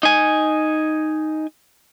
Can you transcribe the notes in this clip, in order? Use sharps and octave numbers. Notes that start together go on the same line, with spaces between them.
D#4 G#5